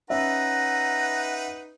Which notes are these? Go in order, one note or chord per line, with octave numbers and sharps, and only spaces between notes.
C#4 D#4 B4 E5 F#5 A#5